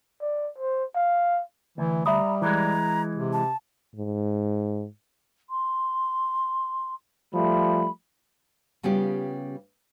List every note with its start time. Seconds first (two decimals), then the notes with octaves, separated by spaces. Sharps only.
0.21 D5
0.59 C5
0.95 F5
1.78 D2 E3
2.06 G3 E5 A#5 B5 D#6
2.42 E3 G#3 A#5
3.15 C3
3.33 A5
3.95 G#2
5.50 C6
7.34 F3 G3 A3 B5
8.83 C#3 G3 B3 C#4 F4 G4